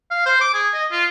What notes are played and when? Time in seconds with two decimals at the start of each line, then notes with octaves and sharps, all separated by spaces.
0.11 F5
0.26 C5
0.41 D6
0.54 G#4
0.74 D#5
0.92 F4